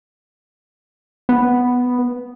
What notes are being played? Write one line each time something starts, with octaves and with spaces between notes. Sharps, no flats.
B3